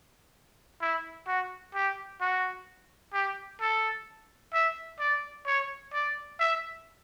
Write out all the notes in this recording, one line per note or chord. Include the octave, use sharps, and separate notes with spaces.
E4
F#4
G4
F#4
G4
A4
E5
D5
C#5
D5
E5